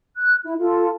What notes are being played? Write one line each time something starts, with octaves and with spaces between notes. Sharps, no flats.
F#6
E4
F4 A4